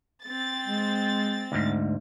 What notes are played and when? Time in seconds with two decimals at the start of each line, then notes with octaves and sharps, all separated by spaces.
0.24 C4 A6
0.67 G#3
1.52 D2 G#2